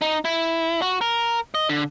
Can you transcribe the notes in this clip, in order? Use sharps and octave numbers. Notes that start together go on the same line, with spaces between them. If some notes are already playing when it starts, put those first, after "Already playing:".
D#4
E4
F#4
A#4
D#5
D3